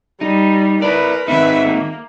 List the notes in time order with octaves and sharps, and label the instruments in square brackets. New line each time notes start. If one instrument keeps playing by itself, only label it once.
[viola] G3 [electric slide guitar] D#4
[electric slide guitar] E4 D5 [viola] A#4 B4
[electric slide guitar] D#3 C4 D#4 [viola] B4 E5
[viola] A#3